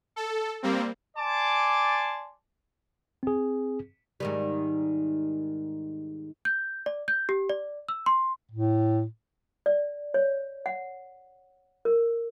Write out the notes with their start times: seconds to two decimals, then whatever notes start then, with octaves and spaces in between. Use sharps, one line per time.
0.16 A4
0.63 G3 A#3 C4
1.17 D5 G#5 A5 C6 D6
3.23 C4 G#4
4.20 G#2 D#3 G3
6.45 G6
6.86 D5
7.08 G6
7.29 G4
7.49 D5
7.89 E6
8.06 C6
8.51 A2
9.66 D5
10.14 C#5
10.66 F#5
11.85 A#4